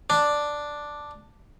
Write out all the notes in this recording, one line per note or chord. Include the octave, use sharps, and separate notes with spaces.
D4